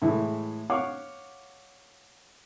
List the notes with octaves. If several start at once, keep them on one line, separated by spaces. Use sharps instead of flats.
A2 E3 G#3 A3
C#5 F5 F#5 C#6 D6